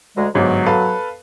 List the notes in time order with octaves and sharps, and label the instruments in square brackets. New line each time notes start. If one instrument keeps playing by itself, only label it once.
[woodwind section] D2 G#3
[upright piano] G1 G#2 [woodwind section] F#3
[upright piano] A4 B4 F5